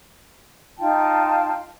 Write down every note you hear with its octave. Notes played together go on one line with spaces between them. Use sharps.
D#4 F4 G5 A5